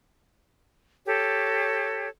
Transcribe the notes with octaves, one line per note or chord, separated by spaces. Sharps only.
G4 A4 C#5